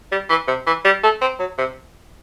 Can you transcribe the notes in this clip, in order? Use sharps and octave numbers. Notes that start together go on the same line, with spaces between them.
G3
E3
C3
E3
G3
A3
C4
F#3
C3